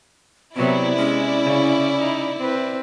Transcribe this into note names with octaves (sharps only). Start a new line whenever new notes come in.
C3 F#3 B3 C4 E4 D5
G#3 C#4
C#3
D#4
C4 B4